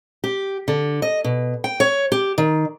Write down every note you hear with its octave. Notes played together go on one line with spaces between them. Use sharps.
G4
D3
D#5
B2
G5
C#5
G4
D#3